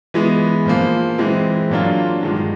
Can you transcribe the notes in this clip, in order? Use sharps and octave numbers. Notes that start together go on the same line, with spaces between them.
E3 G#3 B3
A#2 F3 A#3
E3 G#3 C4
A#2 F#3 A#3 D4 F4
G2 D#3 G#3